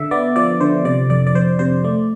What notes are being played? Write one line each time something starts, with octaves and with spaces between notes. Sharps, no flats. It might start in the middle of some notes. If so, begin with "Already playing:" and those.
Already playing: D3 E5
B3 D5
F3 D5
D3 C5
C3 D5
F2 D5
D5
F2 C5
C3 C5
A3 D5